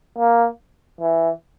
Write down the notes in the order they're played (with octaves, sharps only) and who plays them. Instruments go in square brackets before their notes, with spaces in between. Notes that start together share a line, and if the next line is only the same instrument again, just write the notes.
[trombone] A#3
E3